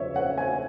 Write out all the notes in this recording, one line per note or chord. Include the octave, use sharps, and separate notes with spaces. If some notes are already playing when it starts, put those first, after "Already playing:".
Already playing: F#1 E2 C#3 F3 C#5 E5
F#5
G#5